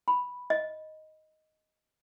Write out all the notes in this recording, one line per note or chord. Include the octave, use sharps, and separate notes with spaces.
B5
D#5